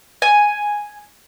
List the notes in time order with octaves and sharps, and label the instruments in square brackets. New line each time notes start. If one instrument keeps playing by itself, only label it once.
[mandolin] G#5